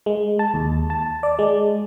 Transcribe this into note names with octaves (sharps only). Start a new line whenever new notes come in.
G#3
A5
D#2
A5
D5
G#3